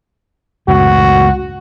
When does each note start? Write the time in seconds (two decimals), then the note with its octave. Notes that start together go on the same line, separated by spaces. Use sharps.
0.68 C#2 F#2 A2 F#4